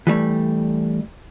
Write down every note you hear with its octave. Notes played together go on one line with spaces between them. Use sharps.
E3 G3 A3